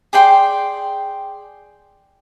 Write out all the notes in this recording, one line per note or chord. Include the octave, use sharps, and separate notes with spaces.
G#4 D5 G5 C6